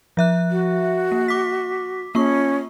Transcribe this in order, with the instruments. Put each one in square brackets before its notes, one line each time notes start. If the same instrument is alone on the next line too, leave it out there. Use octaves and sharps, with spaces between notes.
[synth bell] F3 E5 F#6
[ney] F#4
[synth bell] A#3
D6 B6
[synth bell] A#3 F4 C#6 [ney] C#4